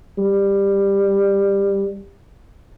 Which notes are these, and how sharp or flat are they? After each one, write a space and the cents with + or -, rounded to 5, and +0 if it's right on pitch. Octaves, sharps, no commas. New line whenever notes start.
G3 +15